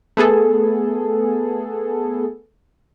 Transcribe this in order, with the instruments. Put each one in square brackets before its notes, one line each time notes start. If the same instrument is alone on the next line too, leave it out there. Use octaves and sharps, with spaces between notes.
[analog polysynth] A3 B3 G#4 A4